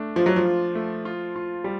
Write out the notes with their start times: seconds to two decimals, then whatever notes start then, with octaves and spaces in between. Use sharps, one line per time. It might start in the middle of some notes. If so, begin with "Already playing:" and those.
Already playing: A3 D4
0.16 F3 F4
0.26 F#3
0.36 F3
0.46 F4
0.75 A3
1.05 F4
1.36 F4
1.64 G3